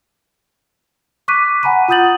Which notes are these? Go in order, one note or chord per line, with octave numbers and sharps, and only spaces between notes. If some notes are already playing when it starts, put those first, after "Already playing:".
C#6 D6 F#6 B6 D#7
F#5 G#5 A#5 B5 D#7
F4 F#5 D#6 G6 A6 F#7